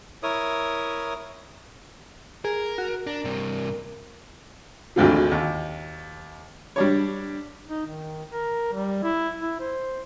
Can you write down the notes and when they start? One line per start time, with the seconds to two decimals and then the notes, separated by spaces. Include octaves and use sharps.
0.23 E4 A#4 C#5 D#6
2.45 G#4 A#4
2.78 F#4
3.07 D4 A#4
3.25 G2 C3
4.96 G#1 D2 D3 F3
5.31 D#2
6.76 G3 D4 C#5
7.67 D#4
7.87 D#3
8.29 A#4
8.73 G3
9.03 E4
9.40 E4
9.60 C5